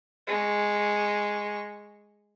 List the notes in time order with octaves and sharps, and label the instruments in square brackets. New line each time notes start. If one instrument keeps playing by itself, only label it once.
[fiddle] G#3 C#6